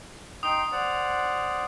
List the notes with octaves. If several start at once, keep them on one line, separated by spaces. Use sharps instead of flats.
D#4 G5 C6 D#6
C5 D5 F#5